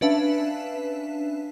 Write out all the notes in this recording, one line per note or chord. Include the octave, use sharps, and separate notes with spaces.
C#4 D4 B4 E5 F5 A5